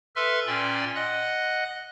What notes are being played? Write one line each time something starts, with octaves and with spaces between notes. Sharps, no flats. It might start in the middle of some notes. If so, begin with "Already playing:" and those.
A4 B4 E5 C6 F6
A#2 C#4 D5 G5 C6
D#5 F#5 F#6